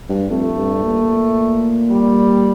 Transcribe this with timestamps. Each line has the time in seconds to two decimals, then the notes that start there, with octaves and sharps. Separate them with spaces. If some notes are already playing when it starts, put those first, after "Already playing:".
0.09 G2
0.29 F2 A3
0.56 G2
0.84 A#2
1.91 G3